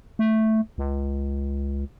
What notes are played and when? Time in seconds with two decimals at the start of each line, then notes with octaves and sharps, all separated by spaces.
0.19 A3
0.78 C#2